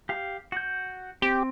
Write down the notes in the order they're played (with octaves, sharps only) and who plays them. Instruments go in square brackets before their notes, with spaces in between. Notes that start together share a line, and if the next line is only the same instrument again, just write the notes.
[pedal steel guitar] G4 F5
F#4 G6
[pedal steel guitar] C4 [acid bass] G4